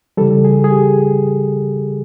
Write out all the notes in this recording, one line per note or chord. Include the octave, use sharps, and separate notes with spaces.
C#3 E3 G3 A4
G#4
G#4
G4